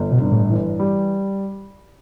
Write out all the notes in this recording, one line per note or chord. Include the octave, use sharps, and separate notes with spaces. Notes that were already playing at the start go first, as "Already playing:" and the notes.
Already playing: G1
B2
G2
A2
E3
G3